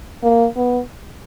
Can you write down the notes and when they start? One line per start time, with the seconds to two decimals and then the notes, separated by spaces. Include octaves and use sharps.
0.23 A#3
0.56 B3